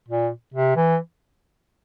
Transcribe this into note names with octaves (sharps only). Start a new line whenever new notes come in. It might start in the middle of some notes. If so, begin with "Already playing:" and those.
A#2
C3
E3